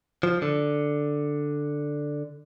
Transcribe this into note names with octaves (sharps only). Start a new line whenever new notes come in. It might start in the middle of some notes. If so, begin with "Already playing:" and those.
F3
D3